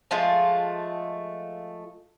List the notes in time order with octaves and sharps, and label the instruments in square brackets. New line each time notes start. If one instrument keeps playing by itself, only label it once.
[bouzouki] F3 G#3 A3 F4